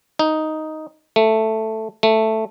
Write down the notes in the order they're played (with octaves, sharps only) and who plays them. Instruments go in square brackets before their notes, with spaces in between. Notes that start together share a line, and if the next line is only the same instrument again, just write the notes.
[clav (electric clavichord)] D#4
A3
A3